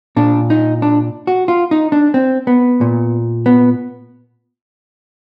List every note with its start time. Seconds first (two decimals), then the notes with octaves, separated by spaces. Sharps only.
0.16 A#2 D4
0.50 D#4
0.82 D4
1.27 F#4
1.48 F4
1.71 D#4
1.92 D4
2.14 C4
2.47 B3
2.81 A#2
3.46 B3